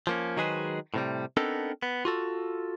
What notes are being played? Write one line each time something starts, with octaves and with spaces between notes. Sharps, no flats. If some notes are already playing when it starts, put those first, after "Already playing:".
F3 A#3 C#4
D#3 F#3 G#3 G#4 B4 C5
A2 C3 G3
B3 C4 D4 D#4 A4 A#4
B3
F4 F#4 A4